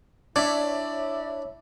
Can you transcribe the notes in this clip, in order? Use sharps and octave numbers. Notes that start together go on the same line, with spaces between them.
D4 E4 C#5 D5 E5